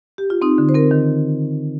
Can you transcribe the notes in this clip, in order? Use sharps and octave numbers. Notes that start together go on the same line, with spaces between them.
G4
F4
C4 D#4
D3
C5
C4 A#4
D#3